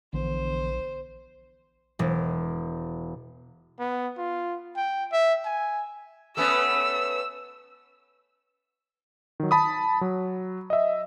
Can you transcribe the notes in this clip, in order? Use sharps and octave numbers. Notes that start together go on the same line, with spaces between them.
A#1 D3 E3 B3 C5
E1
B3
F4
G5
E5
G#5
A3 B3 C#4 E6
D#3 F#3
A5 B5 D#6
F#3
D#5 E5